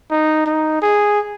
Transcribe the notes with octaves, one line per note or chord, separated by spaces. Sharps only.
D#4
D#4
G#4